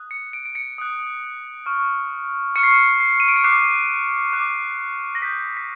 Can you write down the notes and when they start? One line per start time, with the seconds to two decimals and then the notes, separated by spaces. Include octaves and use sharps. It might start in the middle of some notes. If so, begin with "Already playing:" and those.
Already playing: D#6 F#6
0.11 C#7
0.33 D7
0.45 D7
0.55 C#7
0.78 D#6 F#6
1.66 C#6 F6
2.56 C#6 F6 C#7
2.63 C7
2.72 C#7
3.00 C7
3.20 D#7
3.28 D7
3.36 C#7
3.44 D6 F#6 C7
4.33 D6 F#6
5.15 A#6
5.22 D#6 G6 B6
5.57 B6